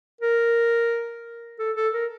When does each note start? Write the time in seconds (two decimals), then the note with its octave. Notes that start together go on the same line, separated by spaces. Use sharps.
0.21 A#4
1.59 A4
1.76 A4
1.93 A#4